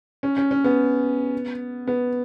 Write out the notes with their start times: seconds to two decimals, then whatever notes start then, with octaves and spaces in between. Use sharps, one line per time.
0.23 C#4
0.37 C#4
0.51 C#4
0.64 B3
1.87 B3